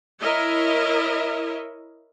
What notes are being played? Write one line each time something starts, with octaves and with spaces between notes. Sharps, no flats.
E4 A#4 C#5 D#5 E5